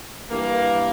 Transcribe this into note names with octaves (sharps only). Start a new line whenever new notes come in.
G2 E3 A#3